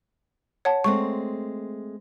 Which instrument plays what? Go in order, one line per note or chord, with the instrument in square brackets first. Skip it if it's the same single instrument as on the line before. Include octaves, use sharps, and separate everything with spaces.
[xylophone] C#5 F#5 A5
[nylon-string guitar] G#3 A3 C4 [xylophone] C#6